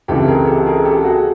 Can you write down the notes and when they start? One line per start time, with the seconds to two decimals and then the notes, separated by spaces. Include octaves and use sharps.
0.08 C#2 C3 E3 G4 A4
0.27 G#4 A#4
0.47 G4 A4
0.66 G#4 A#4
0.85 G4 A4
1.04 F#4 G#4